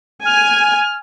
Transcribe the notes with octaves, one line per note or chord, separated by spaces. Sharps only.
G#5 F6